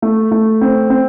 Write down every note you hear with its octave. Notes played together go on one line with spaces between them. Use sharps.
A3
A3
C4
C4